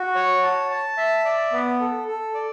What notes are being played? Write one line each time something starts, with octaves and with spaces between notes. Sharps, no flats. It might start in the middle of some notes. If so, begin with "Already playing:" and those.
Already playing: F#4
C#5
A5
A5
E5
D5
B3
A4
A4
D5